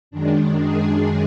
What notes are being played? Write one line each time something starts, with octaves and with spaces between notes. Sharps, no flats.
F#2 D#3 G#3 D4
G#4